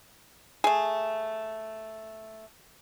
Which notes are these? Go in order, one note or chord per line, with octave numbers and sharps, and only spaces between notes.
A3 G#4